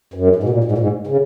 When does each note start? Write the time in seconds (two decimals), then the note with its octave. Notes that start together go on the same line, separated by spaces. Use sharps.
0.14 F#2
0.36 G#2
0.43 B2
0.49 A#2
0.64 G#2
0.72 A#2
0.78 G#2
1.07 C#3